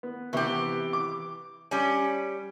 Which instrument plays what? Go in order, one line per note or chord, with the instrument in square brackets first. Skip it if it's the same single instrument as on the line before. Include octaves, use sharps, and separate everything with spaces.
[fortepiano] B3
[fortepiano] C3 B3 C#6 [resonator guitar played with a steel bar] E3 G4
[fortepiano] D6
[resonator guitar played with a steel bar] G3 C#4